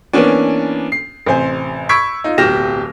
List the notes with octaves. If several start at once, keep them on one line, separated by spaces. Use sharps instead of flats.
E3 A#3 B3 C#4 D4
C7
A1 C3 C5 G#5
B5 C#6 E6 G#6 B6 D7
D#4 F4
D1 B1 G4 F6 A#6 E7